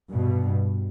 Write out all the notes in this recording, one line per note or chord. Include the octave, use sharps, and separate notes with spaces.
G2 B2